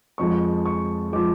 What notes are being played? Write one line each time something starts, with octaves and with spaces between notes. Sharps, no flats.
F2 F3 G#3 C#6
C#6
F3 G#3 D6